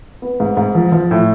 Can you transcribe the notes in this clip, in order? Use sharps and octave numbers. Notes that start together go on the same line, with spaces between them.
B3
G#2
G#2
F3
F3
A2